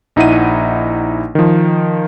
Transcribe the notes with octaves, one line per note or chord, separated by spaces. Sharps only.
A#1 D#4 E4 F#5 D#7
D#3 F3